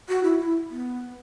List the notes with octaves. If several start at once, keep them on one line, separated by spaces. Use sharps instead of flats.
F#4
E4
E4
B3